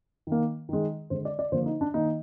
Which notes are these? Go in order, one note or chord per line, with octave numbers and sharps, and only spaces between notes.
D#3 A#3
D#3 G#3
D3 G#3 C5
D5
D5
D3 F3 A#3 C5
D#4
D4
D#3 A#3 D#4